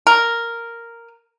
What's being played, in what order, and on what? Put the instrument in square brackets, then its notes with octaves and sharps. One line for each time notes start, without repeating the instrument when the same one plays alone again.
[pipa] A#4